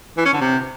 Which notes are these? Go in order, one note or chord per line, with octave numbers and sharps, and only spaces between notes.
E3
C#4
D3
C3